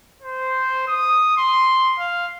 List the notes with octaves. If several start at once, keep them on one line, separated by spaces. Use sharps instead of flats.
C5
D#6
C6
F5